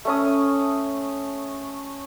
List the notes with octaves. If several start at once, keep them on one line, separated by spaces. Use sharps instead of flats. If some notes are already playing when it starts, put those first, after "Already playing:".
A3 C#4 D#6